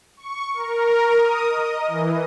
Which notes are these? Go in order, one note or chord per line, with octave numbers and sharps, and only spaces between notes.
C#6
A#4
D#6
D#5
E3